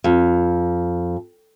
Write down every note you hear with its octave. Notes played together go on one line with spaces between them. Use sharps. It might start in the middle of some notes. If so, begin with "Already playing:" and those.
F2